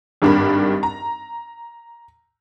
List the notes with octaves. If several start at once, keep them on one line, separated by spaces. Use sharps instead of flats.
G#1 G2 D4 A#4 B5
A#5